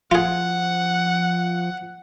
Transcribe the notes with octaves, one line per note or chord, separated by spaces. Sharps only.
F3 F4 G#4 F#5